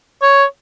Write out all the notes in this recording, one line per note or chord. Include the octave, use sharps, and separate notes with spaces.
C#5